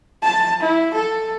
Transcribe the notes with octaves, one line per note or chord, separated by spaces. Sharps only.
A5
E4
A4